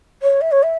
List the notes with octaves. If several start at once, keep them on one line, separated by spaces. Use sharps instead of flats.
C#5
E5
C#5
E5